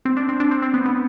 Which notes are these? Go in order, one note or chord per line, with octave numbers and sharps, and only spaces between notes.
C4
D4
C4
D4
C4
C4
B3
B3